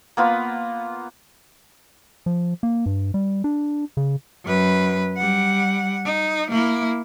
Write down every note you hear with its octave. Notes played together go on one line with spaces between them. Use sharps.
A#3 B3 F4
F3
A#3
G2
G3
D4
C#3
F#2 B4
G3 F#5
D#4
A#3 E4